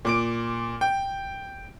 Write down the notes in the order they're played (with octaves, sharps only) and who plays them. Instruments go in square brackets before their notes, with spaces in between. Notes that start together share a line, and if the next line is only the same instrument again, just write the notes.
[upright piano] A#2 D6 D7
G5